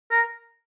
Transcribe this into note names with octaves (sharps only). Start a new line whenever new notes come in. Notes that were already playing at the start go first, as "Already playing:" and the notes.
A#4